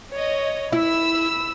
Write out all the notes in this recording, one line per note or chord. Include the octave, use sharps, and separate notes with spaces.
C#5 D#5
E4 B5 E6